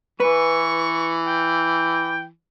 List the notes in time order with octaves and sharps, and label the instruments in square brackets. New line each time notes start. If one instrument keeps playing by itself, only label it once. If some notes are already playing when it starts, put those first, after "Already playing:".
[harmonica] E3 [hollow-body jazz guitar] B4 [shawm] C#6
[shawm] G5